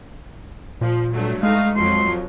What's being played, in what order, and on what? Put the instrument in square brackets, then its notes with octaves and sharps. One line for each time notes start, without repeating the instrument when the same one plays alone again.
[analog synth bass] A#2 [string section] F3
[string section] G2 F#3 A3
[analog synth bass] G#3 [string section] A3 D#4 [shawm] F5
[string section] F2 F3 F#3 [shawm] C6